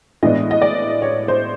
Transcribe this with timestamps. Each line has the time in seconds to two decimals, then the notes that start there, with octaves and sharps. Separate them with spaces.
0.23 A2 E3 G#3 B3 D4 D#5
0.51 D#5
0.62 D5
1.02 C#5
1.28 C5